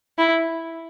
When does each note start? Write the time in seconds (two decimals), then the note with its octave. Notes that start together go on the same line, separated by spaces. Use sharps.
0.18 E4